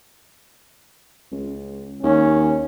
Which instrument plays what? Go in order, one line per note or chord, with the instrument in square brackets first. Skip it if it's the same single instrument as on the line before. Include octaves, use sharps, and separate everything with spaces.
[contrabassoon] C#2
[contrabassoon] D#2 [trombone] C#4